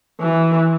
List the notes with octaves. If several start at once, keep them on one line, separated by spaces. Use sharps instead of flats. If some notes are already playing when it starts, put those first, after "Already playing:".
E3